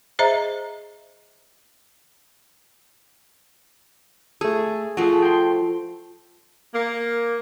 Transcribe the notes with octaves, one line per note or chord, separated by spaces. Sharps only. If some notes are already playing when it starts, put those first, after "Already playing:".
G#4 C5 D#5 E5 A#5
A3 G#4 A4
F3 A3 F#4 G#4
G5 C6
A#3